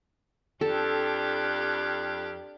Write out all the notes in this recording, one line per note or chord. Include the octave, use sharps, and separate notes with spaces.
F2 D4 G4 A4